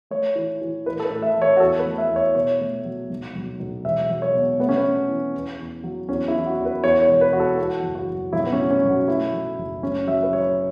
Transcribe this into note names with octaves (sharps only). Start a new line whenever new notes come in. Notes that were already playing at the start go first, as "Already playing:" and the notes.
A3 C#5
E3
E3
A1 B4
A4
B4
A2
E5
A1
C#5
F#4
E2 A4
B4
A3
E5
E2
C#5
B2 C#5
A3
F#3
B1
B1
B1
E1 E5
F#3
C#5
B2
A3 B3
C#4
B3
A3
E3
E2
E2
F#3
E2 C#4
E4
E3
F#4
E2
B4
E2 C#5
C#5
E1
B4
E2 F#4
A4
E2 F#4
F#1
F#4
F#1
B1 E4
B3
C#4
A2
C#4
B1
F#4
A3 E4
F#3
F#1
A3 C#4
F#3 E5
B4
F#3 C#5